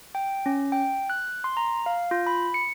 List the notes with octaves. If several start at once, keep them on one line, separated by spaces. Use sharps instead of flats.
G5
C#4
G5
F#6
C6
A#5
F5
F4
B5
C#7